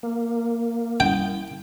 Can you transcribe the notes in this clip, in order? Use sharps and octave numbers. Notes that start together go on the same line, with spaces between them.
A#3
G3 C#4 G5 G7